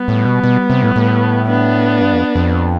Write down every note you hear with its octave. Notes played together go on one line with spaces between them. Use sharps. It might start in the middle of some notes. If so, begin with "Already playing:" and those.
Already playing: G3 B3
A2
B2
B2
C3
A2
A2
B3 D4
G2
F2
F2